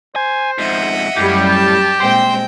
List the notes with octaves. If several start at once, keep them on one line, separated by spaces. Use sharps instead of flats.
C5 G#5
F2 G#2 D#5 E5 F#5
F#2 A2 G3 G4
A5
A#2 G#3 C4 C5 G5